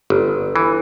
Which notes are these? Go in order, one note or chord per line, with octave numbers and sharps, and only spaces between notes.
G1
E3